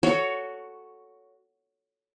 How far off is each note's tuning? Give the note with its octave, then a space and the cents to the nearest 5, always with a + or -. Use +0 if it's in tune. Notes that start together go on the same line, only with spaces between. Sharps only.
F#4 +0 A4 +0 C#5 +15